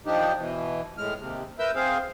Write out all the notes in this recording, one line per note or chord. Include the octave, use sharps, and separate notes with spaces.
D#3 F3 D4 D#4 G4
B2 E3
A2 G#3 F6
D#2 C3
A#4 B4 E5 E6 G6
C4 G#4 C5 F5